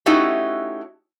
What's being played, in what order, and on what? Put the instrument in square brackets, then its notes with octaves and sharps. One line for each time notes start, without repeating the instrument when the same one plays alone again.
[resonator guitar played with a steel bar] A3 C#4 D#4 E4 F#4 G4